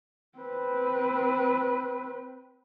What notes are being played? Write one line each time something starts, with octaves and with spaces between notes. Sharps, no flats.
C4 B4